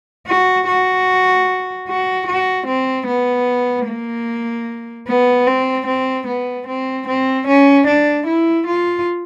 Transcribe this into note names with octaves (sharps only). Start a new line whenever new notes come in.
F#4
F#4
F#4
F#4
C4
B3
A#3
B3
C4
C4
B3
C4
C4
C#4
D4
E4
F4